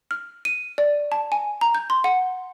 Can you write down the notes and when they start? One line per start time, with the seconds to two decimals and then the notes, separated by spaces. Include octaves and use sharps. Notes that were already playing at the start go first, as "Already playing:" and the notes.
0.11 F6
0.45 D#7
0.78 D5
1.12 A5
1.32 G#5
1.61 A#5
1.75 G6
1.90 C6
2.04 F#5